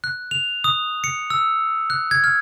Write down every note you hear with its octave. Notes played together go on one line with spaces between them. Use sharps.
F#6
F7
D#6
C#7
E6
F#6
G#6
F6